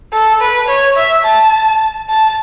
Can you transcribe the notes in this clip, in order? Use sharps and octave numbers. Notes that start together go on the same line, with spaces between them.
A4
B4
C#5
E5
A5
A5